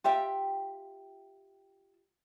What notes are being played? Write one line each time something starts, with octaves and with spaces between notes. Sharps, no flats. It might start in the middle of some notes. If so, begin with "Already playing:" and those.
F4 G4 E5 G5